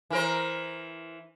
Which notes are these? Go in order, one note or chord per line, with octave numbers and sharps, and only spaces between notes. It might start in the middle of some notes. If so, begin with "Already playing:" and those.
E3 A#4 C5